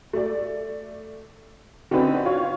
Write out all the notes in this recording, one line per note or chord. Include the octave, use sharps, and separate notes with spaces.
A3 D5
D3 C4 C#4 D#4 B4
F4 C#5